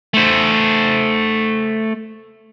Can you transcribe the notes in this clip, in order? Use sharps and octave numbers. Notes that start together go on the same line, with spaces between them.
A3 C5